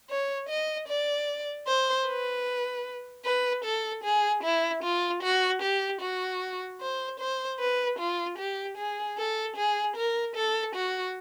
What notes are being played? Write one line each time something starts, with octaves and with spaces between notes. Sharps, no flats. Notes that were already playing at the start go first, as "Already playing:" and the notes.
C#5
D#5
D5
C5
B4
B4
A4
G#4
E4
F4
F#4
G4
F#4
C5
C5
B4
F4
G4
G#4
A4
G#4
A#4
A4
F#4